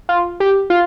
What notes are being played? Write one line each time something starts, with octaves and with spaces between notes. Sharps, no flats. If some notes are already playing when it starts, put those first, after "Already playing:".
F4
G4
F4